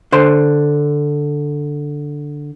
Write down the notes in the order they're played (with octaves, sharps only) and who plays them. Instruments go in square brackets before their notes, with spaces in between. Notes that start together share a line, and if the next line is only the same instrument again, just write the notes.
[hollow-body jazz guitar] D3 C5 C6